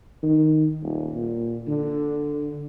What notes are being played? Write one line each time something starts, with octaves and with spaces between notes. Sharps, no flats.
D#3
D#1
A#2
D3